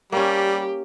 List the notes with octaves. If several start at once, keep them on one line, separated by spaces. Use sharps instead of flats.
G3 A#3 C#4 G4